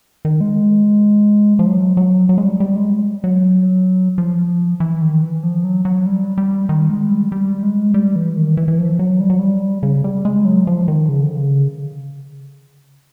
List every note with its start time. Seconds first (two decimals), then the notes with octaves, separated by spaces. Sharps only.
0.25 D#3
0.41 G#3
1.59 F3
1.66 F#3
1.97 F#3
2.29 F#3
2.38 G#3
2.45 G3
2.60 G3
2.76 G#3
3.24 F#3
4.18 F3
4.80 E3
5.01 D#3
5.22 E3
5.43 F3
5.64 F#3
5.85 F#3
6.06 G3
6.38 G3
6.69 D#3
6.90 G#3
7.10 G3
7.32 G3
7.63 G#3
7.94 G3
8.16 E3
8.36 D#3
8.57 E3
8.68 E3
8.78 F3
8.99 F#3
9.20 G3
9.30 F#3
9.39 G3
9.83 C#3
10.04 G3
10.25 G#3
10.45 F#3
10.67 F3
10.88 D#3
11.09 C#3
11.23 D3
11.36 C#3